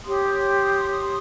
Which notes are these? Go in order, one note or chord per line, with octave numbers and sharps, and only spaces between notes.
G4 C#5 C6 D#6